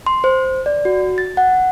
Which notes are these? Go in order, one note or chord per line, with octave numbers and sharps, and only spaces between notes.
C6
C5
D5
F#4
A6
F#5